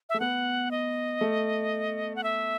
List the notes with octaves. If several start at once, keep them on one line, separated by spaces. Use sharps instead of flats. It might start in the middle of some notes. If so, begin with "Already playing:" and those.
A3 E5
B3 F#5
D#5
A3
F#5
E5